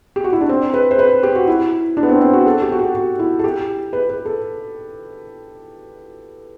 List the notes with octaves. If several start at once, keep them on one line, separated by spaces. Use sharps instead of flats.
G4
F#4
E4
D4
C4
B4
C5
B4
G4
F#4
E4
D4
B3
C4
C4
F#4
A4
G4
F#4
G4
F#4
E4
A4
G4
B4
B4
A4